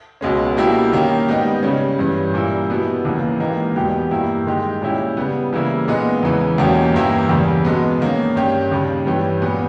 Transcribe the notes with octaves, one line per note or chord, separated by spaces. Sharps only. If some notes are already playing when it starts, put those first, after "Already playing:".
C#2 B2 G#3 C#4
B2 G3 A#3 E4 G4
D#3 A#3 C#4 G4
G#2 G3 B3 D#4 G4
C#3 G3 C#4
G2 E3 G3 C#4
A#2 G3 A#3 E4
B2 G3 B3 E4
D#2 C#3 E3 A#3
G#2 E3 A#3 D#4 G4
E2 B2 G3 B3 G4
G2 G3 A#3 E4 G4
D#3 G#3 D#4 G4
A#2 G3 C#4 E4 G4
C#3 G3 B3
C#3 E3 G3 A#3 E4
A#2 G#3 B3 D#4
E2 C#3 E3
E2 B2 A#3 C#4 G4
G2 E3 A#3 E4 G4
E2 C#3 G3
B2 G#3 B3
D#3 A#3 C#4
G2 G3 C#4 G4
D#2 C#3 G3
G2 E3 G3 C#4 G4
A#2 G3 B3